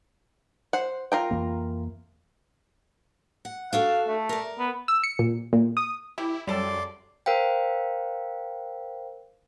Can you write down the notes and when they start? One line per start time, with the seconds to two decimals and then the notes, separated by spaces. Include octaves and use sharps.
0.73 C5 F#5
1.12 F4 A#4 G5
1.31 F2 E3 A#3
3.45 F#5
3.73 D4 F#4 A4 F5
4.08 A3
4.29 A#4 D5
4.59 B3
4.88 E6
5.04 C#7
5.19 A#2
5.53 A#2
5.77 D#6
6.18 E3 G3 E4 G4
6.47 F#2 C#3 G3 A4 D5 A5 C6 D6
7.26 A#4 C5 F5 G5